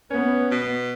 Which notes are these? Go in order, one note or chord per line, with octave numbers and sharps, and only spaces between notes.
B3 C#4
B2